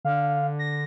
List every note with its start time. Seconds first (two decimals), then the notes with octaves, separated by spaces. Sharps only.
0.05 D3 F5
0.59 A#6